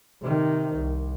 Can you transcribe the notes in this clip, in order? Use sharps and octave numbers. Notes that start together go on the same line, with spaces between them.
C3 D#3
C2